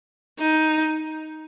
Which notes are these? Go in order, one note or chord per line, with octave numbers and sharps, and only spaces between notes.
D#4